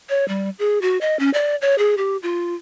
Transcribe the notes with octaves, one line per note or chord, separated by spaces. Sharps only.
C#5
G3
G#4
F#4
D#5
C#4
D5
C#5
G#4
G4
F4